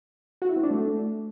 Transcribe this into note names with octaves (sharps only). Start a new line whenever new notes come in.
F#4
E4
C4
D4
A3